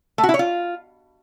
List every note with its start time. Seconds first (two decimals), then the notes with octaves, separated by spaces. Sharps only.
0.18 A3
0.23 F#4
0.29 E4
0.34 C#5
0.39 F4